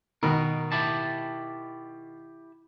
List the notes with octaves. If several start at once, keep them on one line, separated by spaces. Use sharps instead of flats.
B2 D#3 A#4
E4 G4 A5